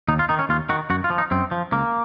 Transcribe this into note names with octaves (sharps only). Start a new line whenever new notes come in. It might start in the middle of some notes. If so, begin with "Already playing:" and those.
D#2 D#4
F4
D#3 D#4
C#4
D#2 F4
D#3 F#4
F#2 F#4
F4
F3
D#4
F#2 C4
F3
C#2 A#3